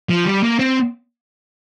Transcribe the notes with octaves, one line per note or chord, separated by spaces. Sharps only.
F3
G3
A#3
C4